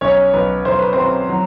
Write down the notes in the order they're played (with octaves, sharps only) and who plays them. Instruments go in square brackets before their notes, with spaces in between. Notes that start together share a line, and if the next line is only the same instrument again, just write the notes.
[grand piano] B1 C#4 C#5
B1 B4
B1 C5
B4
F#3 C4 C5
F#3